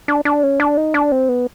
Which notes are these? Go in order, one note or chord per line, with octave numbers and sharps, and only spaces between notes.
D4
D4
C#4
D4
D#4
D4
C4
B3